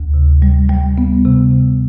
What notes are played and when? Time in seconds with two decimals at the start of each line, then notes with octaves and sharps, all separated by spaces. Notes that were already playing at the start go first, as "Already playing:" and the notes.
Already playing: D2
0.14 C3
0.42 G3
0.69 G3
0.98 B3
1.25 C3